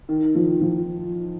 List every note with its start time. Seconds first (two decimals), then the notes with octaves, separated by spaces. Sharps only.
0.09 D#3
0.35 F3
0.61 F3